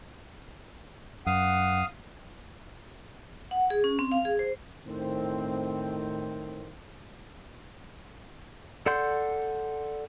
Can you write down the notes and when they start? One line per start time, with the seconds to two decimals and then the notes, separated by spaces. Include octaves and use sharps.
1.26 F#2 F5 F#5 D#6
3.51 F#5
3.70 G#4
3.84 C#4
3.99 C4
4.12 F5
4.25 G#4
4.39 C5
4.85 A2 D#3 C4
8.86 A4 D5 F#5 C6 G6